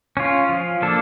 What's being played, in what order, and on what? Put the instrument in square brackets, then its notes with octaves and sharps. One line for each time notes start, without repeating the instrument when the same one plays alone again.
[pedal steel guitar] C#4 F4
F3
A#3 D4 A4